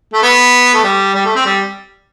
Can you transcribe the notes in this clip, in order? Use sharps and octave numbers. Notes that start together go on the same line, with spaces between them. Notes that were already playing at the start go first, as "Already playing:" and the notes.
A3
B3
A3
G3
G3
A3
C4
G3